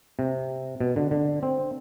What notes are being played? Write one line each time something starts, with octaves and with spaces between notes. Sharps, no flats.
C3
B2
D3
D3
C4